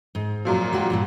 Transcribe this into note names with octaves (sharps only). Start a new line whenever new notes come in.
G#2
F#2 A#2 F3
G#3 F#4 G4
G2 A#2 G3